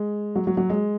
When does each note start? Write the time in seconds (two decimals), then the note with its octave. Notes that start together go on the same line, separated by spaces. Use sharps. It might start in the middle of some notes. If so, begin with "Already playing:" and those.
Already playing: G#3
0.35 F#3
0.47 F#3
0.57 F#3
0.70 G#3